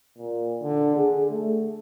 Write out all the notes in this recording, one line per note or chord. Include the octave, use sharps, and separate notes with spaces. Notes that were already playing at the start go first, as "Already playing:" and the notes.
A#2
D3
G#4
A3